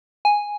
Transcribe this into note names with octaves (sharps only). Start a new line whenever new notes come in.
G#5